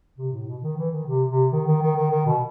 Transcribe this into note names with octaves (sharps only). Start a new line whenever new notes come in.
C3
A2
B2
D#3
E3
D#3
C3
C3
D#3
D#3
D#3
D#3
D#3
B2